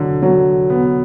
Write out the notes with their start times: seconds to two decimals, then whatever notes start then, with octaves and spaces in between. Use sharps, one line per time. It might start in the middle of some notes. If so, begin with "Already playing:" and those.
Already playing: D3 F#3
0.22 F#3
0.70 B3